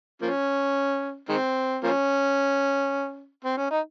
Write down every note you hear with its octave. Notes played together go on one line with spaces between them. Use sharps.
F3 A#3 C#4
D#3 G#3 C4
F3 A#3 C#4
C4
C#4
D#4